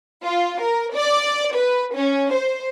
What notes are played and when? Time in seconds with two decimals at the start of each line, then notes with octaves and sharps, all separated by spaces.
0.24 F4
0.61 A#4
0.95 D5
1.55 B4
1.94 C#4
2.33 C5